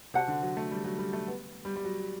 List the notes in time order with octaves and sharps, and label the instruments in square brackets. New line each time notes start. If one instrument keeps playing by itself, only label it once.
[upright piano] C3 [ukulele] F#4 C5 F#5 A5
[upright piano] D3
F#3
A3
G3
F#3
G3
A3
B3
G3
G3
F#3